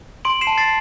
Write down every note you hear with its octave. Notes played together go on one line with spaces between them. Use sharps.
C6 D7 F#7
C7 E7
A5
A6 C7